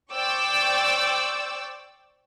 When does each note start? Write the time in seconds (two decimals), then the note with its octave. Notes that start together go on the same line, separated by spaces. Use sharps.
0.13 C5 D5 G5 C#6 D6 E6